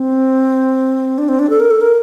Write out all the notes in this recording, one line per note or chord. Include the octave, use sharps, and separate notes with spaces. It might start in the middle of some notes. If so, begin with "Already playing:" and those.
Already playing: C4
D4
C4
D4
A4
A#4
A4
A#4